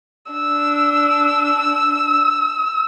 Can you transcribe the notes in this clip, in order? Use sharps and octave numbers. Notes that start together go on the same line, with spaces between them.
D4 E6